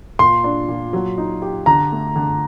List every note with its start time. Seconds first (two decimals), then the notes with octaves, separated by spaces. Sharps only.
0.19 A#2 C6
0.44 D4
0.68 A#2
0.93 F#3
1.18 D#4
1.42 G4
1.66 D3 A#5
1.92 A3
2.16 D3